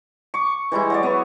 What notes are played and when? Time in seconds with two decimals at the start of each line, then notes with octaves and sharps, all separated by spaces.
0.34 C#6 D6
0.72 E3 G3 G#3 E4
0.90 F#3 C#5 D5
1.03 B3 C#6